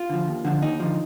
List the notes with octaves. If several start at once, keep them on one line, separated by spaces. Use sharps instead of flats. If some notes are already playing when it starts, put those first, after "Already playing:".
Already playing: F4
D3 F3
D#2
D3 F3
D#2 D#4
D3 F3